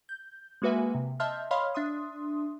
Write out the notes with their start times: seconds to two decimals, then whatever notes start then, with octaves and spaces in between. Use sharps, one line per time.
0.09 G6
0.62 G#3 A#3 F#4 B4 E5 G#5
0.95 C3
1.20 D#5 E5 A5 C6 F6 G6
1.51 C#5 D#5 F5 B5 C6 F6
1.74 D4 E5 C6 D#6